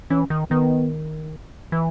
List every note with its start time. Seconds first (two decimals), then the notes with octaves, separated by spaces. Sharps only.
0.10 E3 C#4
0.30 D#3
0.50 D#3 B3
1.72 E3